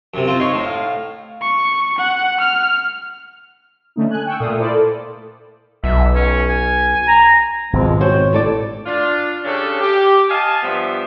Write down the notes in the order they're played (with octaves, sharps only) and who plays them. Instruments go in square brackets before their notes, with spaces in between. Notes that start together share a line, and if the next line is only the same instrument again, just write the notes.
[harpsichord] F#2 C3
C4 F4
[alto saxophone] D#4 [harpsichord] C#5 C6
[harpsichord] A2
[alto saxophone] F5
[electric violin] C#6
F#5
F6
[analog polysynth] D3 A3 C#4 D#4
G#5 F#6
G5 C#6 E6
A#2 A3 F5 D#6
E4 A4 A#4 C5 D5
[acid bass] B1 [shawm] E5
[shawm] C#4
G#5
[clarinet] A#5
[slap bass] G#1 B2 [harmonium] F3 G#3 C4
[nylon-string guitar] C4 F#4 C5 [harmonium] C#5
[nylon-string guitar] A2 A4 D5
[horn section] D4 F4
C#3 C#4 D4 G4 A4
G4
D#5 F5 G#5 A5
G2 F3 B3 G4 E5